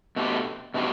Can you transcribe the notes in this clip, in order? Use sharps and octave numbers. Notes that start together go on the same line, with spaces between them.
B2 A3 D4 G4
B2 A3 D4 G4